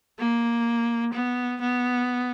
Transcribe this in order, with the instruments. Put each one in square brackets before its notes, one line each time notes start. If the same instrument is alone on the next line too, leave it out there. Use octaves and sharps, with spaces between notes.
[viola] A#3
B3
B3